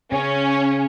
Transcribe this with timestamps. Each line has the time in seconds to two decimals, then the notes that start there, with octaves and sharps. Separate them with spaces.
0.12 C#3 C#4